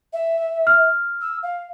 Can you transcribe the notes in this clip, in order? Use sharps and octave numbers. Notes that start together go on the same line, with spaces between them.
E5
F6
E6
F5